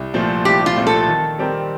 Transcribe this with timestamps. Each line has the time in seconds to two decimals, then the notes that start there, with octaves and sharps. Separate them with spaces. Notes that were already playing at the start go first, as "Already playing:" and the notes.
Already playing: C2
0.14 A#2 F3 A3 C4
0.45 C2 G4
0.66 F4
0.76 A#2 F3 A3 C4
0.87 A4
1.08 D#3
1.38 G3 C4 G4 A#4